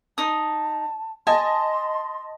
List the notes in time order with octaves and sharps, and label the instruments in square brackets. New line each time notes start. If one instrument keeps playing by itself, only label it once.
[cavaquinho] D#4 D#6 [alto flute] A5
[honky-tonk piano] D#5 A5 [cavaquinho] G#5 [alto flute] C6